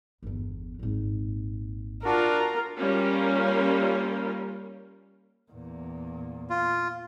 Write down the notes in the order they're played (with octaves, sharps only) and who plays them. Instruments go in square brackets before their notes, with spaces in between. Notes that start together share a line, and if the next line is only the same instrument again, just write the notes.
[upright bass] G1 E2
G#1 A#2
[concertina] D4 F#4 [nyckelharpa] F4 [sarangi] A#4
[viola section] G3 A#3 C#4 F4 A#4
[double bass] E2 A#2
[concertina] F4